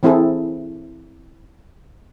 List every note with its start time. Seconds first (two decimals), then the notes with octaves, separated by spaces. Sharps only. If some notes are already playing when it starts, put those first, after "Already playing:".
0.03 E3 C4 E4 G#4 A4